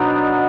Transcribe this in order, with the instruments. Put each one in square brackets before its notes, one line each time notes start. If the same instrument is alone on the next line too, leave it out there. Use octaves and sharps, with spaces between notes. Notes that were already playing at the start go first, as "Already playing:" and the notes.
Already playing: [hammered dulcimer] B2 F#3 B3 D4 D#4